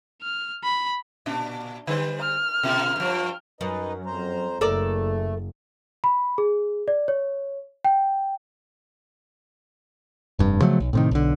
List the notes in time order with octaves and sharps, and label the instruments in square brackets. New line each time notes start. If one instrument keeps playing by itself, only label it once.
[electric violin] F6
B5
[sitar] A#2 D4
[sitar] D3 G3 C5 [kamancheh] B4
[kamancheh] F6
[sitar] B2 A#3 F4
G2 F3
[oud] F#2 [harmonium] D#4 B4 D#5
[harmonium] F2 C5 A#5
[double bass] F#1 [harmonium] A3 [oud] A4 A#4 D5
[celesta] B5
G#4
D5
C#5
G5
[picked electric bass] F1 G2
C#3 F3 F#3 A3
B1
A2 C3 D#3
B1 D3